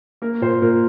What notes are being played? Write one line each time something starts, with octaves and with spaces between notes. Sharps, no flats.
A#3 A#4
A#2 C5
A#2 A#4